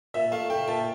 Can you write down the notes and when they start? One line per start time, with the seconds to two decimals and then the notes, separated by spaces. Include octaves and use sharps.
0.14 A#2 E5
0.32 A3 F5
0.50 A3 G5
0.68 A#2 A5